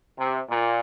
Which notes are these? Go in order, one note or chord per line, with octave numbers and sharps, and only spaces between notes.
C3
A#2